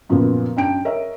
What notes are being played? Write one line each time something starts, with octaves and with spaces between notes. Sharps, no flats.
F#2 A#2 C#3 F3 A#3 B3
F#2 D4 G5 D7
A#4 C#5 D#5 E5